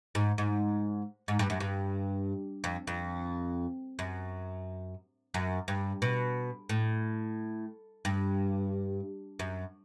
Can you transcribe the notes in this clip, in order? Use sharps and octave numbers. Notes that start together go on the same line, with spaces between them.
G#2
G#2
G#2
G2
F#2
G2
F2
F2
F#2
F#2
G2
B2
A2
G2
F#2